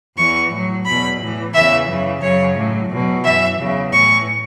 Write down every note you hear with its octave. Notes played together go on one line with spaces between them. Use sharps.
E2 E3 C#6
A2 F#3
E2 B2 F#3 B5
A2 E3
E2 C#3 E3 E5
F#2 C#3 E3
F#2 C#3 F#3 C#5
A2 F#3
E2 B2 F#3
F#2 E3 E5
E2 C#3 F#3
A2 E3 C#6